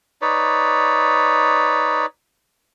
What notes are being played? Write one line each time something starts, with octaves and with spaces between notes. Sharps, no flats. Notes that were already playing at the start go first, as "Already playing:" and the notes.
D#4 B4 C#5 D5